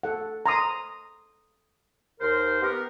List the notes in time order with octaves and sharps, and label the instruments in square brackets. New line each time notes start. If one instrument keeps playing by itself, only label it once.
[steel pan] A4 F#5
A#5 C6 D#6
[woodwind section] D#2 A#4 C5
B3 G4 A#4